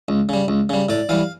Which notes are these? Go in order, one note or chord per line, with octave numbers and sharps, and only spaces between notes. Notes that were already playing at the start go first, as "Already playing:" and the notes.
C#2
C#3 G3
C#2
C#3 G3
A2 D5
E3 G3 F5